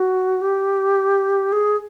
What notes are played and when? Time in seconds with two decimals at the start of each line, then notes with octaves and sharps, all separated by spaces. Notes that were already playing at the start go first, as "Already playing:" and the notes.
Already playing: F#4
0.41 G4
1.52 G#4